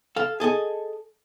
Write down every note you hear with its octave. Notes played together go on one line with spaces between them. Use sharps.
A4 F5
G#4 A4 D#5 G#5